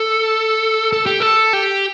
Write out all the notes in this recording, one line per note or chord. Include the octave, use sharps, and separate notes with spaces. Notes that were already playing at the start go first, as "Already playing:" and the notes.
Already playing: A4
A4
G4
A4
G4